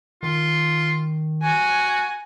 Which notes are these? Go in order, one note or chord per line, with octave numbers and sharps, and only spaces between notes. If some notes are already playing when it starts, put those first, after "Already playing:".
D#3 F4
F#4 G#5